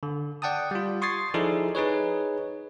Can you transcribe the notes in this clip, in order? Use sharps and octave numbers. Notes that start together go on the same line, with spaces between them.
D3
D5 F#5 G5 A5 D#6
G3 F4
C6 C#6 D#6 G#6 A6 C7
F3 D#4 E4 G#4 A4 D5
D#4 G#4 B4 C#5